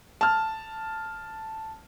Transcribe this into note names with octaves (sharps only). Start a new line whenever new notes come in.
A5 F6